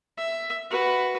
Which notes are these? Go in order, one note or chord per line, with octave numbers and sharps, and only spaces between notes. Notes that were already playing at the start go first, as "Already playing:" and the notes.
E5
F#4 B4